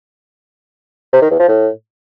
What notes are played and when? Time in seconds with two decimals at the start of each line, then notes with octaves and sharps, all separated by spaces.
1.13 C3
1.22 D#3
1.31 E2
1.40 F3
1.48 A2